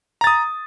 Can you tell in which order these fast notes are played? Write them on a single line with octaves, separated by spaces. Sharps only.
A#5 A6 D#6